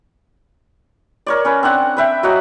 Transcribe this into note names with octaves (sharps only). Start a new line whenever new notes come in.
A#4 C#5 D5
C#4 B4
C4 D4 F#5
B4 E5 G5
F#3 F#4 D#5 F#5